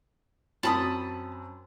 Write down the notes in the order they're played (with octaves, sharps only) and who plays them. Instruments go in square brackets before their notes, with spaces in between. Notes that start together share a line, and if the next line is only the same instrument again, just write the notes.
[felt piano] F#2 C4 [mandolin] A5 B5 D#6